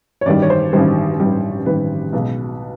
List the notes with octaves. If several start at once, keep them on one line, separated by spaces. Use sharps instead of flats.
C#5
A1 G2 D#3 G3 D5
C#5
C5
A1 G2 D#3 G3 C5
A1 G2 D#3 G3
A1 G2 D#3 G3 B4
B1 B2 G#3